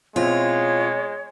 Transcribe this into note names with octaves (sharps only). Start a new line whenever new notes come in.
B2 G#3 C4 E4 F4 C#5